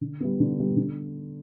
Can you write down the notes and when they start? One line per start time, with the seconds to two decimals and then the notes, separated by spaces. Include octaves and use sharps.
0.01 D3
0.20 G3 B3
0.40 D3
0.58 G3 B3
0.76 D3